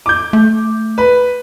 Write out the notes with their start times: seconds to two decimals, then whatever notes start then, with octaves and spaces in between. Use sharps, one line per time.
0.06 D6 G6
0.33 A3
0.98 B4